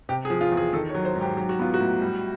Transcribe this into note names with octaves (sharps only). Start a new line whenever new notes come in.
C3 G4
G#4
F3
F4
E2
G#4
D#3 A4
C#5
F#3
C5
G#2
G4
F#3 G4
F#4
B3 F4
F#4
A2
G3